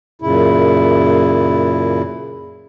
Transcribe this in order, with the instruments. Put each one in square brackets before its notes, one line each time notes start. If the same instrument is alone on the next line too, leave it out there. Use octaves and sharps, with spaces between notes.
[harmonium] F#2 A#2 C#3 E4